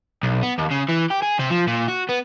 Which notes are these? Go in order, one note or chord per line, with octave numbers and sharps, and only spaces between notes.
B1
B3
D#2
C#3
E3
G4
G#4
C3
F3
A#2
F#4
B3